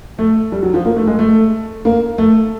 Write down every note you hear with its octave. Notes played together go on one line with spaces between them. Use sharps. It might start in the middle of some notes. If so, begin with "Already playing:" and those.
A3
G3
F#3
F3
A#3
A3
G#3
A3
A#3
A3